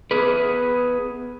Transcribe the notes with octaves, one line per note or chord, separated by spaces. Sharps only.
B3 G#4 B4